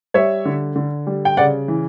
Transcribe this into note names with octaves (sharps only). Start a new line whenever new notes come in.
G3 C#5 E5
D3
D3
G3
G5
C#3 D5 F#5
E3